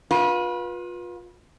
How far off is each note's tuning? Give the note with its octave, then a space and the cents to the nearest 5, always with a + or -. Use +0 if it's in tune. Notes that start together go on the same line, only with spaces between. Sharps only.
F4 +30 B4 -25